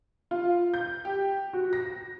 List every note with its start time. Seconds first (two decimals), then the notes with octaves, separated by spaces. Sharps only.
0.31 F4
0.74 G6
1.05 G4
1.53 F#4
1.73 A#6